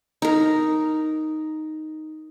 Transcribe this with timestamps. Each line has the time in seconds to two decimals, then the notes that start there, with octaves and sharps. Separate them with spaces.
0.22 D#4 A#4